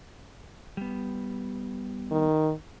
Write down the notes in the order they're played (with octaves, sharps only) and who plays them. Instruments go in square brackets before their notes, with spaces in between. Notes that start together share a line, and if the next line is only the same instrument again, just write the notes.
[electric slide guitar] G3 B3
[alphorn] D#3